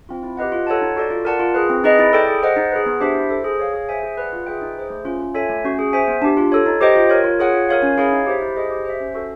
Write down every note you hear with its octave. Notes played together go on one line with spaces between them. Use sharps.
C4 F4
E4
G4 B4 D#5 F#5
F4
A4 C#5 F#5 A5
D#4
F#4 A4 D5
F4
A#4 D5 F#5 A5
F4
G#4 B4
C4
D#4 G#4 B4 D#5
E4
A4 D5 G5
G#4
C5 D#5 F#5
D#4
G#4 B4
B3
D4 G4 C5 E5
E4
A4 C5
G#4
C#5 F5
G#4
C5 E5 G#5
G#4
B4 D5 F#5
F4
G#4 B4 E5 G5
D#4
G#4 C5
A3
C#4 F4
F4
A4 C#5 E5 G#5
A3
C#4 F#4
G#4
C5 E5 G#5
B3
D4 G4
F4
A4 C#5
D#4
G4 C5 D#5 G5
F4
A#4 C#5
F4
G#4 C#5 F#5
F4
A#4 C#5 F5
C#4
E4 G#4 C#5 F5
D#4
G4 C5 E5
E4
G#4 C5 D#5
G4
C5 E5
C#4
F#4 A4